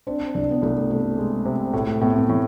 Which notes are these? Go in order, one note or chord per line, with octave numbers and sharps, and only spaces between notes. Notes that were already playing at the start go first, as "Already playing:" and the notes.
C4 D4
C2 D4
B3
C2 A3
C3 A3
G#3
C3
A2 A3
A2 B3
C4
B3
A2 E3